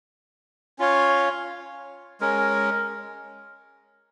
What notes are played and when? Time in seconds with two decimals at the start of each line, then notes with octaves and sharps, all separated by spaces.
0.79 C#4 F4 C#5 F5
2.20 G#3 C#4 A#4